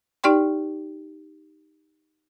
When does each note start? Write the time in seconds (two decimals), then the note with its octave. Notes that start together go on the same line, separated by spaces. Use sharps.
0.24 D#4 G4 D5 G5 C6